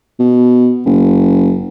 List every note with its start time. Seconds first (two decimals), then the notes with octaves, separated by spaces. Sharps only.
0.19 B2
0.86 F#1